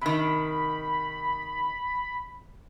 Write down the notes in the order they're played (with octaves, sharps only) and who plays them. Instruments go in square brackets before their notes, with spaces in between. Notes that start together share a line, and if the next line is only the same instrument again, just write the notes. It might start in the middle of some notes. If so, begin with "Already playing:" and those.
[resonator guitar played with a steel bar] C3 D#3 [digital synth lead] B5